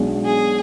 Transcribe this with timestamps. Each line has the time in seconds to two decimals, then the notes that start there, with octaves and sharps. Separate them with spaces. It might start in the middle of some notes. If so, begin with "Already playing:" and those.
Already playing: B1 B2 G#3 D4
0.25 G#4